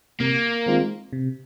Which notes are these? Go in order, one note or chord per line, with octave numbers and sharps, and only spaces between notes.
C3 A#3
D#3 G#3 C4 F4
C3